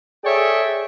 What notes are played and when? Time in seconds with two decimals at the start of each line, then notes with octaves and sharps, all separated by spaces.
0.24 G#4 A4 C#5 D5 E5 G5